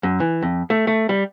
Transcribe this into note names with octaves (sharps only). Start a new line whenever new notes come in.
F#2
E3
F2
A3
A3
G3